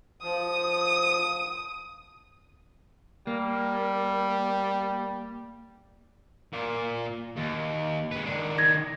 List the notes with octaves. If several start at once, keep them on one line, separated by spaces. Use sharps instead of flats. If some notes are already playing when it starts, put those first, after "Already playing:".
F3 D#6
G3 A#3
A#2 A#3
D#2
G#3 B4
D#3 D4
G#6 A#6